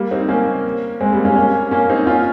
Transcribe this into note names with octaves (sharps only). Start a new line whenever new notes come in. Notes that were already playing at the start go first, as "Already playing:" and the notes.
Already playing: G3 A#3
C4 D#4
A#3 C#4
G#3 C4
G3 A#3
A#3 C#4
A#3 C#4
A#3 C#4
C4 D#4
C#4 F4